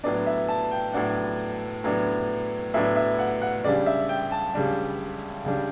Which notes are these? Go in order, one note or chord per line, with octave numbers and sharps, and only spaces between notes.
A2 F#3 B3 D4 D5
E5
A5
G5
A2 F#3 B3 D4 F#5
A2 F#3 B3 D4
A2 F#3 B3 D4 E5
E5
F#5
F#5
C#2 C#3 G3 D4 D5
E5
G5
A5
C#2 C#3 G3 D4
C#2 C#3 G3 D4